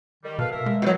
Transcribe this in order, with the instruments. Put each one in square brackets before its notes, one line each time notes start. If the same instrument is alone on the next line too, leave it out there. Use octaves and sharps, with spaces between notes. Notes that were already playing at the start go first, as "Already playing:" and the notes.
[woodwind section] D#3 G3
[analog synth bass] B2 [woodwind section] A4 B4 F5
[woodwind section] A#3 A#4 E5
[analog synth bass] G#3
[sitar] B2 F#3 [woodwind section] B3 C4